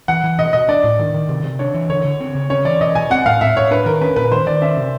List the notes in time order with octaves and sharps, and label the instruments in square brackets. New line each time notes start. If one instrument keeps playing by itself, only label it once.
[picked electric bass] E3 [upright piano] F#5
[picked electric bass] E3
[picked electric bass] B2 [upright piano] D#5
[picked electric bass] B2 [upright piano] D#5
[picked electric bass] D4 [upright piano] D5
[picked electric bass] A2
D#3
D#3
C3
C3
[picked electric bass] D4 [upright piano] C#5
[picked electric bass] E3
[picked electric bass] D3 [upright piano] C#5
[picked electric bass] D3
C4
C#3
[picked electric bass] C#4 [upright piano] C#5
[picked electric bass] E3 [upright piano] D5
[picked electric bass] B2 [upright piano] D#5
[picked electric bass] B2 [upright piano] G#5
[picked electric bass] C4 [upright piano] F#5
[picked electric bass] A2 [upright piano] F5
[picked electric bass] A2 [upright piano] E5
[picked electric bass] A2 [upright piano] C#5
[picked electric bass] D4 [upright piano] B4
[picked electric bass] D#3 [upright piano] A#4
[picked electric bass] C#4 [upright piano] B4
[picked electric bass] A#2 [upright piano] B4
[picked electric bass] D#3 [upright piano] C5
[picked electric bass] D#3 [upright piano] D5
[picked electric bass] C#4 [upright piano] E5
[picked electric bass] C3